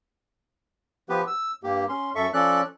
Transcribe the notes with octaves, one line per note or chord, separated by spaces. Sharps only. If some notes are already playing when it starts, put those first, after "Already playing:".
F3 B3 G4 B4
E6
G2 A#3 G4
C#4 C6
F#2 A4 E5 C#6
F3 C#4 A4 D5 F#6